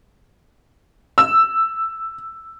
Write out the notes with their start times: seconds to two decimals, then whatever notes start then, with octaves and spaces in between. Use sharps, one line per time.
1.18 E6